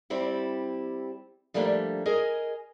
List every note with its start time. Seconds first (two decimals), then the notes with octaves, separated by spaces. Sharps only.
0.10 G3 C4 E4 G4
1.54 F3 G3 A3 A#3 C4 D4
2.06 G#4 A#4 D#5 G#5